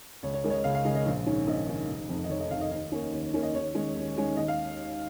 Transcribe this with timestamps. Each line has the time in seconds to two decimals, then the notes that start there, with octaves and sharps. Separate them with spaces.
0.23 C#2 C#5
0.34 C#5
0.44 C#3 G#3 A#4
0.50 C#5
0.54 D#5
0.64 C#2 F5
0.75 F5
0.85 C#3 G#3 D#5
0.95 D#5
1.06 A#1
1.26 G#2 D#3 C#4
1.47 A#1 D#5
1.68 G#2 D#3 C#4
1.89 F1
2.09 F2 D#3
2.24 D#5
2.30 F1 C#5
2.40 D#5
2.51 F2 D#3 F5
2.61 D#5
2.71 D#2 D#5
2.92 D#3 A#3 C#4
3.13 D#2
3.34 D#3 A#3 C#4
3.42 D#5
3.55 D#2 C#5
3.75 D#3 G#3 C#4
3.96 D#2
4.16 D#3 G#3 C#4
4.37 D#2 D#5
4.48 F5